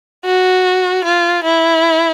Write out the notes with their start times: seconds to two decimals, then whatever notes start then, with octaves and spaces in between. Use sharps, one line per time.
0.25 F#4
1.04 F4
1.44 E4